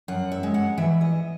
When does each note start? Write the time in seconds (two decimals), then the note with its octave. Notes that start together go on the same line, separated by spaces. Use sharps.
0.08 F#2 F#5
0.32 E5
0.43 G#3
0.54 F#5
0.78 E3 E5
1.01 D#5